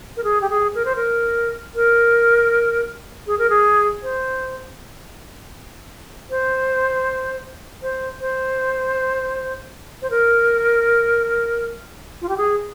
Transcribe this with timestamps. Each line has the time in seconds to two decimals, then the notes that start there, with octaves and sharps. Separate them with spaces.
0.17 A#4
0.24 G#4
0.41 G4
0.50 G#4
0.75 A#4
0.85 C5
0.96 A#4
1.75 A#4
3.27 G#4
3.38 A#4
3.50 G#4
4.03 C5
6.30 C5
7.82 C5
8.20 C5
10.02 C5
10.10 A#4
12.21 F4
12.29 G4
12.37 G#4